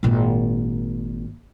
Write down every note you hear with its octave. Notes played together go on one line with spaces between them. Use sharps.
G#1 A#2